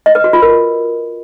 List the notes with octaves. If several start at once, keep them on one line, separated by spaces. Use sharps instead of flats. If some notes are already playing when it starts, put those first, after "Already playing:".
D#5
B4
F#4
F4
A#4